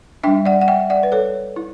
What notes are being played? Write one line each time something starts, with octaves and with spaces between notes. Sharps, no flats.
G3 D4 E5 G5
D5 F#5
F#5
E5 G5
D5 F#5
B4
A4 C#5
E4